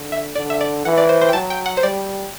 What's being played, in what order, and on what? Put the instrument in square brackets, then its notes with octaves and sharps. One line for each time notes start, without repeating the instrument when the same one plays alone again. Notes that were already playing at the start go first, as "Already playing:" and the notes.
Already playing: [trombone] D3
[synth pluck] E5
[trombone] D3 [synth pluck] D5
[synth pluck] E5
D5
[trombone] E3 [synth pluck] F#5
[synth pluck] D5
C5
C5
G5
[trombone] F#3 [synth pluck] A5
[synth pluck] G5
F#5
C5
[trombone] G3 [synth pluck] D5